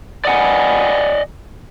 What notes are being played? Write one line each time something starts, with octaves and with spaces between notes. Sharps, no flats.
D5 D#5 F#5 G#5